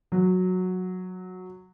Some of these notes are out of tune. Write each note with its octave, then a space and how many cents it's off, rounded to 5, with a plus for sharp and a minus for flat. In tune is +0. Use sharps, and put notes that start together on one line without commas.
F#3 -10